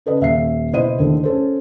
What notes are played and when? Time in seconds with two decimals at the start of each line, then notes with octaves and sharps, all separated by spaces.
0.06 C#3 A4 B4 D#5
0.21 D#1 E5 F5 C7
0.73 B2 E4 C5 D#5 D#7
0.98 D#2 D3 A3
1.23 C#4 A4 C5